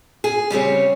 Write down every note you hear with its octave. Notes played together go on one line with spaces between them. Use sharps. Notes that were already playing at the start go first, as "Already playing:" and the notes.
G#4
C#3 G3 C4 C#5